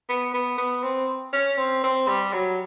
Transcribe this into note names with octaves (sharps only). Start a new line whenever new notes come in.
B3
B3
B3
C4
C#4
C4
C4
G3
F#3